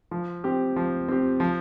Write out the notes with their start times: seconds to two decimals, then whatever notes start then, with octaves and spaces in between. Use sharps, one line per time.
0.11 F3
0.44 C4 G4
0.76 F3
1.08 C4 G4
1.40 F3